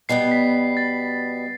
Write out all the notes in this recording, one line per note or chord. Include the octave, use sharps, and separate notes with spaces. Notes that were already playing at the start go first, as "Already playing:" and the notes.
B2 G3 B3 C7
B6
A6